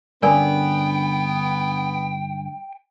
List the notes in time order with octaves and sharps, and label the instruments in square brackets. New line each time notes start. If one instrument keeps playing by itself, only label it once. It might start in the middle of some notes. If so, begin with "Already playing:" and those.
[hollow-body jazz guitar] G2 D3 C#4 [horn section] B3 [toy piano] A#4 D5 G#5 [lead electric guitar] G5